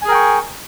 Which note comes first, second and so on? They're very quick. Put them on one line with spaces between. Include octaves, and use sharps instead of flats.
G#5 G#4 A#4 G5 C#6